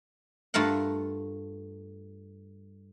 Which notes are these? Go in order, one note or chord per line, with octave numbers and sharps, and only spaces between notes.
G2 A3 F4 A#4 F#5